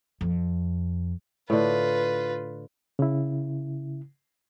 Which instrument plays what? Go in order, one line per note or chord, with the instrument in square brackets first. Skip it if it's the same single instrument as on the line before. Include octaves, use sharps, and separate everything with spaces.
[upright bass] F2
[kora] A2 D3 [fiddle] F4 B4
[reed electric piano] C#3 E4